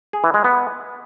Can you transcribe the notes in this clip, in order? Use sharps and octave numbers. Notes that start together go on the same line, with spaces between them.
G#4
E3
G#3
B3